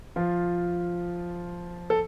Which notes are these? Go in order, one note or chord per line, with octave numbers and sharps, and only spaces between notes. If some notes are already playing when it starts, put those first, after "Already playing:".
F3 F4
A4